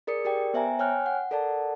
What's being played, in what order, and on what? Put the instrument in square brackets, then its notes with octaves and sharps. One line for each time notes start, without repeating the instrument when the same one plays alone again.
[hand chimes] G#4 A#4 D5 D#6 C#7
G4 A#4 D5 G5
B3 C5 E5 G5 G#5 A#5
C#5 G5 G#5 F6 F#6
F#5
A4 A#4 D5 F#5 A5